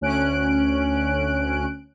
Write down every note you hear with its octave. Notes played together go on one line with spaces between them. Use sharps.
D2 C#4 F#6 D7